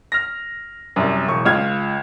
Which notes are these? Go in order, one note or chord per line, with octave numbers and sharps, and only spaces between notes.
F6 A#6
C2 F#2
E1 C#6
C#2 F4 F6 G#6